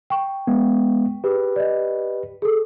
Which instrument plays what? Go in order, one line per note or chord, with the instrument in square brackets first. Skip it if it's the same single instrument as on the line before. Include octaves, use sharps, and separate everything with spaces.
[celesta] G5 C#6
[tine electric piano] G#3 B3
[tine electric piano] G4 B4 [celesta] G#4
[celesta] D5 D#5
G#4 A4